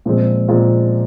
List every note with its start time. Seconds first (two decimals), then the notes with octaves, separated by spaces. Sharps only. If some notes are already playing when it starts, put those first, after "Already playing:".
0.06 A#2 F3 G#3 C4
0.48 A#2 F3 G#3 C4